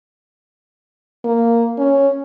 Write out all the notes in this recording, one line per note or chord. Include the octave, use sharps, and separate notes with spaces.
A#3
C#4